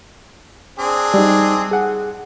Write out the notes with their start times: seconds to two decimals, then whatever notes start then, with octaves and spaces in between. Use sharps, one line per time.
0.79 C4 D4 G#4
1.14 G3 D#4
1.71 G#4 F#5 G#5